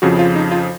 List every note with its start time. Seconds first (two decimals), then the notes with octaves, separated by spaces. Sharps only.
0.02 F2 C#3 F3 F#4
0.19 F4
0.35 D#4
0.52 F4